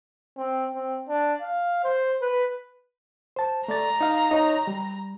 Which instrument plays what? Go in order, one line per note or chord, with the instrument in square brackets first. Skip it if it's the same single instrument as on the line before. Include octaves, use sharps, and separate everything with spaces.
[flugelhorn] C4
C4
D4
F5
C5
B4
[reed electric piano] C5 A5
[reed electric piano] A3 D5 A6 [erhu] A#5
[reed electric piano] D#4 F5
D#4 C#5 D#5
G3